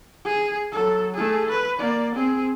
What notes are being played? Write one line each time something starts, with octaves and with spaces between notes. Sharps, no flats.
G#4
F#3 A4
A3 G#4
B4
A#3 D5
C4 G#4